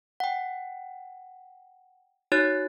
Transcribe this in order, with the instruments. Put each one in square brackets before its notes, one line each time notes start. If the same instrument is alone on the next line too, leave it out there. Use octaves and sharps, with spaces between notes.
[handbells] F#5 G5
D#4 F#4 C#5 F#6 A6